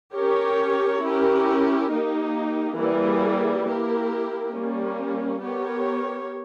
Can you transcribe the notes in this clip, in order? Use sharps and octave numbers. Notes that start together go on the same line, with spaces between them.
C#4 G4 A#4 C#5
C#4 E4 G4 A#4
A#3 D#4 G4
E3 G3 A#3 E4 G#4
A#3 E4 G4 A#4
G3 A#3 C#4
B3 G4 A#4 C#5